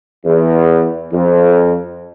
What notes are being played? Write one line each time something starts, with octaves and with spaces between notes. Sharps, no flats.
E2
F2